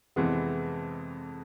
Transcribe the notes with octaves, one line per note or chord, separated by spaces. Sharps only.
F2 C3 E3 G#3 B3